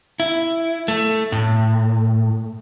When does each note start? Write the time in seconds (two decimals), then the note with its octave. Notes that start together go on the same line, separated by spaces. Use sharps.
0.20 E4
0.88 A3
1.32 A2